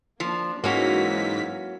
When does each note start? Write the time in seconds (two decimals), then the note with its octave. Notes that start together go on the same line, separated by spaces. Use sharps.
0.20 F3 A#3 D4
0.64 G#2 E3 F#3 A#3 C#4 F#4 B6